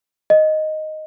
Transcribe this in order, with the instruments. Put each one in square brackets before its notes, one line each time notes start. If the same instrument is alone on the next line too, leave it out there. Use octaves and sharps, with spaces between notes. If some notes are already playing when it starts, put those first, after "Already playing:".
[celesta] D#5